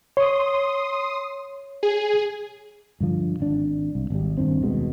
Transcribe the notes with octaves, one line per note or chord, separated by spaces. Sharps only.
C#5 C6 D#6
G#4
G2 D3 F3
G#1 D4
C2
G#1 G3
D#1 G2 D#3 C4
D#1 C2 B2 G#3